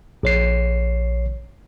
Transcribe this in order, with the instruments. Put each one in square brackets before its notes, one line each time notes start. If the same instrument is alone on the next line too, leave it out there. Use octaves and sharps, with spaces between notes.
[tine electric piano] A#1 C#5 C7